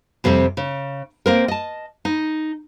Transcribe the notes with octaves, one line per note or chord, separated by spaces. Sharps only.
F2 C3 G3 C4
C#3
A#3 C4 A#4
D#5 A5
D#4